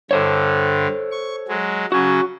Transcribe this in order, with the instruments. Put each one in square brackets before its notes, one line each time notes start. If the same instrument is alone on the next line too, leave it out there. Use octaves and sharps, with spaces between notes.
[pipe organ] G2 D3 [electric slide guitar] A4 C5 C#5
[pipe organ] C#6
F#3 G#3
[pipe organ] C#3 F#3 C#4 [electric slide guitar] F#4